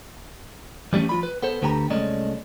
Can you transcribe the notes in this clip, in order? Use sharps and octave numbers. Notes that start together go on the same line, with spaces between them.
E3 G3 A3 C#4
F3 F4 B5
B4
B3 A4 C5
D2 D3 A3 G4 B4 A#5
C2 G#3 A3 C#4 D5 D#5